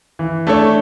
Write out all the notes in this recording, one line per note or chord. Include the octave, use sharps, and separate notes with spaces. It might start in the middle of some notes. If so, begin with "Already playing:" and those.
E3
A3 D4 A4 C#5